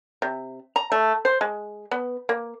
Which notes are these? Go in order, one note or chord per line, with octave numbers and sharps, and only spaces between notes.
C3
A#5
A3
C5
G#3
B3
A#3